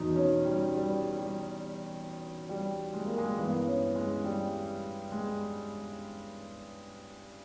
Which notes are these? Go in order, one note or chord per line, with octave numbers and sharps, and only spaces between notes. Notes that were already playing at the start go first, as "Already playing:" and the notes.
Already playing: E2 B2 D#4
C#4
G3
G3
G3
G3
G#3
A#3
G#3
G2 E3 B3
C#4
G#3
G3
G#3